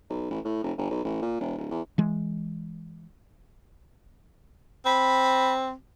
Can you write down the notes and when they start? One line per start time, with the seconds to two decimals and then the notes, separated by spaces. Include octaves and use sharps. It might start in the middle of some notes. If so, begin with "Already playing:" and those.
0.10 B1
0.31 A1
0.45 A2
0.63 F1
0.78 G1
0.91 B1
1.04 A1
1.22 A#2
1.40 E1
1.58 D1
1.71 E2
1.98 E3 G#3
4.86 C4 B5